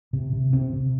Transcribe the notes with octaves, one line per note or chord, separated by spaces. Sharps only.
C3
C3
C3 C4
C3